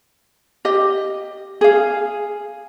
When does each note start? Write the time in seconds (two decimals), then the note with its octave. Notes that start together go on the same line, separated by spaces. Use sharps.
0.65 G4 D#5
1.61 G#4 F5